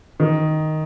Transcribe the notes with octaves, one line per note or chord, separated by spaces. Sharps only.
D#3